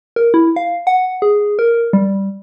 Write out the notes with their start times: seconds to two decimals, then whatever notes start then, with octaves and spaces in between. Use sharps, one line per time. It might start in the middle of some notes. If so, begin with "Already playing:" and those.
0.16 A#4
0.34 E4
0.56 F5
0.87 F#5
1.22 G#4
1.59 A#4
1.93 G3